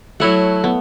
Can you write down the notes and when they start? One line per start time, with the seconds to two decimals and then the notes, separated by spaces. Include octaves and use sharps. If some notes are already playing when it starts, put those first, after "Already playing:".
0.20 F#3 A3 E4 C#5 F#5
0.64 B3